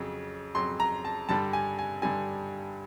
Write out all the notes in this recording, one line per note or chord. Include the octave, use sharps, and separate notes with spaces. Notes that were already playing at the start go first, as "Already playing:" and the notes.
Already playing: F2 C#3 F#3
F2 C#3 F#3 C6
A#5
A5
G2 D3 G3 A5
G#5
G#5
G2 D3 G3 G#5